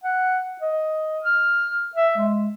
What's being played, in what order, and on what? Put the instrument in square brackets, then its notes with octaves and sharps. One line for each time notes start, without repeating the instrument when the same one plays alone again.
[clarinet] F#5
D#5
F6
E5
G#3